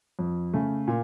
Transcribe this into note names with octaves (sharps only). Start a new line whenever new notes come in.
F2
C#3 A3
A#2